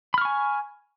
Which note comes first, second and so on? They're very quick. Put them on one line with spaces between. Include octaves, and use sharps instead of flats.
B5 F6 C#6 G#5